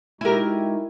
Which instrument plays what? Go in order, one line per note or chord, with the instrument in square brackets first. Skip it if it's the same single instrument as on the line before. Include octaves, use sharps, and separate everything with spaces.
[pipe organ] G#3 D#4 F#4 [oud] E4 A#4 [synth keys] G4 G#5